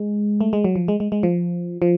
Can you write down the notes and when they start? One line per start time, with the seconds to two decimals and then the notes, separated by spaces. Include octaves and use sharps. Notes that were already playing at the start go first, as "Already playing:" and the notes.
Already playing: G#3
0.41 A3
0.53 G#3
0.64 F#3
0.76 F3
0.88 G#3
1.00 G#3
1.12 G#3
1.23 F3
1.82 F3